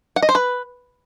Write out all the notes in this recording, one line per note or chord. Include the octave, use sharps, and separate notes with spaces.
F#5
D#5
C5
B4